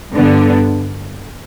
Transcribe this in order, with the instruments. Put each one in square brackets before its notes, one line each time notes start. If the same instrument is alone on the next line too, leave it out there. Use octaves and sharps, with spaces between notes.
[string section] G2 D3 B3 D4